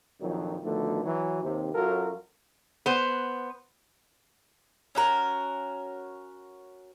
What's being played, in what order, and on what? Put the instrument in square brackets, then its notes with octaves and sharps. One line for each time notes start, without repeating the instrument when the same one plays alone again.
[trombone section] A#1 F2 D#3 F#3
B2 D3 D#3 F3 A3
E3 F#3
D#2 C3
F#2 F#3 F4 F#4 A4 A#4
[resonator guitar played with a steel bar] B3 C5
[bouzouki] C#4 F#4 A#4